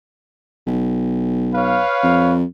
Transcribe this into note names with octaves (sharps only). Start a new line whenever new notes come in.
B1
B4 C#5 F5
F2